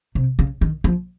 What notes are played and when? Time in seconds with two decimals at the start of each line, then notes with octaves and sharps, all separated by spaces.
0.15 C3
0.39 C#3
0.61 D#3
0.84 F3